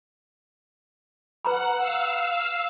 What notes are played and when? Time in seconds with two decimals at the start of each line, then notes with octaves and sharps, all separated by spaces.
1.45 B4 F#5 A#5 B5
1.77 F5 E6